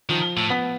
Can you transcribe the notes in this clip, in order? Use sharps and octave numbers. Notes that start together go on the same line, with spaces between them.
D#3 F3
A2
B3